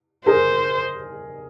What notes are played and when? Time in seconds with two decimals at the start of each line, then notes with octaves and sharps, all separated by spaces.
0.26 G#4 A#4 C5